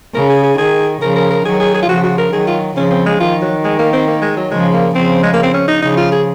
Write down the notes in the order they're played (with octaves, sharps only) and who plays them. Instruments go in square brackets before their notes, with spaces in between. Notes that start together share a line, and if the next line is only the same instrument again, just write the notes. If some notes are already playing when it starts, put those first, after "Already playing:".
[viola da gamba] C#3 [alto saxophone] A#4
[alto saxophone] G#4
G#4
[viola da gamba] D#3 [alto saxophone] G#4
[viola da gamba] C#3 F3 [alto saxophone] A#4
[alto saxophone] A#4
A#4
[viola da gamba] D#3 F#3 [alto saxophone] G#4
[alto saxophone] G#4
G#4
F4
[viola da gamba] C#3 F3 [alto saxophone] F#4
[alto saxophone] F#4
A#4
[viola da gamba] D#3 F#3 [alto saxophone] G#4
[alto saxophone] F4
[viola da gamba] C#3 F3 [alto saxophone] C#4
[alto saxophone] C4
G#3
[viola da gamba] D#3 [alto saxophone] F4
[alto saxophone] F#3
G#3
A#3
C4
A#3
G#3
F#3
[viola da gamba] C#3 F3 [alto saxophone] G#3
[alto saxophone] A#3
[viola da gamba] C#3 F3 [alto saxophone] C4
[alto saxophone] G#3
A#3
C4
C#4
D#4
[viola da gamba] C#3 F3 [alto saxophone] D#4
[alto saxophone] F4
G#4